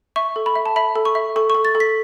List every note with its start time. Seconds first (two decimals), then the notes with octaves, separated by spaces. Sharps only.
0.16 E5 C#6
0.36 A4
0.46 B5
0.56 E5
0.66 A5
0.76 E5 B5
0.96 A4
1.05 C#6
1.15 E5
1.36 A4 C#6
1.50 A4 C#6
1.65 A6
1.75 A4
1.80 B6